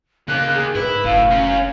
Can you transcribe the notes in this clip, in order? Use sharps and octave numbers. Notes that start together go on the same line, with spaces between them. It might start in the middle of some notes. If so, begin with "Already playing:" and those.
C#3 A#3 G4 F#6
G#4
G#2 E4 B4
F#1 A2 F5
C#4 A#4